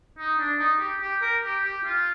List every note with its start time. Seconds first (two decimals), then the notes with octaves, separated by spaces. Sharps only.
0.19 D#4
0.39 D4
0.59 D#4
0.80 G4
1.01 G4
1.22 A#4
1.43 G4
1.64 G4
1.84 F4